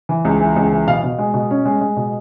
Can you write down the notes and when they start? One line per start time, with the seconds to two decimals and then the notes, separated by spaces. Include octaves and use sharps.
0.09 E3
0.25 C#2
0.41 E3
0.56 C#2
0.72 E3
0.87 B2 F5
1.03 B2
1.19 G#3
1.34 B2
1.51 C#4
1.66 G#3
1.81 G#3
1.97 B2